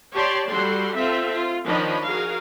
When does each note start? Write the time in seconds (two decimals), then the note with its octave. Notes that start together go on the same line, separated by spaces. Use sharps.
0.14 G4 C#5 D5 A5 C6
0.48 G3 F#4 A4 C6
0.96 C4 F4 A4 E5
1.33 F4
1.67 D#3 F3 D4 C#5 D#5 B5
2.07 F#4 G#4 A#4 F5